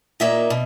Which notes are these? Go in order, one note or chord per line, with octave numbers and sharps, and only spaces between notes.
A#2 A#3 D#4 E5
B2